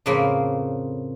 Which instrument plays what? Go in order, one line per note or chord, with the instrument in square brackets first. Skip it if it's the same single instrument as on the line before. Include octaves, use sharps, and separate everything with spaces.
[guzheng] F2 A2 C#3 A#3 C4 B5